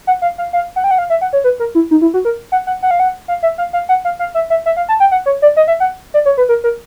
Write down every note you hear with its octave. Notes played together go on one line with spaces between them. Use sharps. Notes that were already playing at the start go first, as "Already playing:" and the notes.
F#5
F5
F5
F5
F#5
G5
F#5
F5
E5
F#5
C#5
B4
A#4
E4
D#4
E4
F#4
A#4
F#5
F#5
F#5
F5
F#5
F5
E5
F5
F5
F#5
F5
F5
E5
E5
E5
F5
A5
G5
F#5
C#5
D5
D#5
E5
F#5
D5
C#5
B4
A#4
A#4